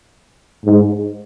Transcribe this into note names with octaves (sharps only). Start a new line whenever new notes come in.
G#2